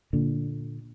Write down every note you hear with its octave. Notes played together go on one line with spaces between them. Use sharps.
A#2 D3